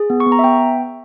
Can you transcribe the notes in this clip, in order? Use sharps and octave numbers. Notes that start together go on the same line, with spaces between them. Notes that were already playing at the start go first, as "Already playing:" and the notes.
Already playing: G#4
B3
C#6
B3
A#5
E5
B3 G5